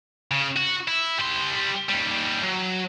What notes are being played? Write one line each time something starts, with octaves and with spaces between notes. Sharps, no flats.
C#3
F#4
E4
G3 C6
D#2 G3
F#3